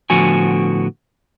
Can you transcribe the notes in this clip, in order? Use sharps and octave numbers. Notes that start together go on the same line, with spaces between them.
A2 D3 F3 B3 F#4 G#5